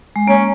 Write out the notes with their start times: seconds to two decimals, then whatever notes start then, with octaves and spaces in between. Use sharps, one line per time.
0.16 G#3
0.28 A#3 C#4